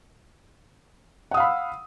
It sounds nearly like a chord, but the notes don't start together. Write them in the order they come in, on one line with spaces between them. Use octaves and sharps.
F#5 D#6 F5 B5 E6